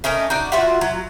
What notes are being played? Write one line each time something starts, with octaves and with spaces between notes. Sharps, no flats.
A3 C#4 D#4 A#4
D#4 F#4 D5
F4 F#4 E5 F#5
F#3